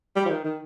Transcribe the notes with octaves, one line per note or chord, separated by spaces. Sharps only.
G3
F3
D#3
D#3